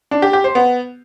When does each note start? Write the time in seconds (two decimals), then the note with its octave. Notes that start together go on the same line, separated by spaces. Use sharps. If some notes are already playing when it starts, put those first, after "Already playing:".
0.11 D4
0.22 G4
0.33 G4
0.44 C5
0.55 B3